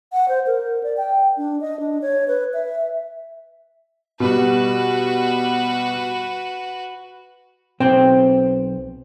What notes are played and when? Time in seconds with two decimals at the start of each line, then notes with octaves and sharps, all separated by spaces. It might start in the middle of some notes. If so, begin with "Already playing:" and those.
0.12 F#5
0.28 C5
0.47 A#4
0.83 D5
0.97 G5
1.37 D4
1.61 D#5
1.80 D4
2.02 C#5
2.28 B4
2.54 E5
4.20 B2 G3 F#4 B4
7.80 B1 C4 C5 G5